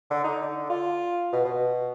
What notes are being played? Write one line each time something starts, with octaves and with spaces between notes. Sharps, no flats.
D3
D#4
D3
F4
B2
B2